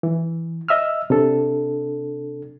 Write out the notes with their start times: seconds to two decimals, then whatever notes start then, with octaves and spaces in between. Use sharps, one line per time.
0.03 E3
0.69 D#5 E5 E6 F6
1.10 C3 D4 A4